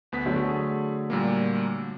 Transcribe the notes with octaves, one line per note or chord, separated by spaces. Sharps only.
D2 B3 B6
D3 F#3 A3
G#4
A#2 G3 A#3